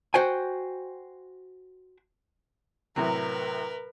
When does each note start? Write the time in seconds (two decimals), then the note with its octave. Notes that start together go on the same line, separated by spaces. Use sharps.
0.14 F#4 C5 G5 G#5
2.96 A2 C3 F#3 A#4 B4